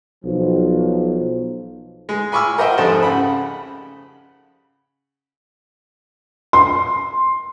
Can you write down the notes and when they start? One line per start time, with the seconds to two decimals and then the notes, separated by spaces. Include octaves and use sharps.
0.23 B1 F3
2.09 G#3
2.32 G#5 B5 C#6 D6 E6 F6
2.58 A#4 C5 D#5 E5 F#5 G5
2.78 F2 G#2 G3 A3 C5 A5
3.03 C#3 F#5 B5
6.53 C6